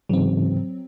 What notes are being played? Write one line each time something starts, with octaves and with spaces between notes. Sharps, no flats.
G#2 C#3 E3 F#3 C4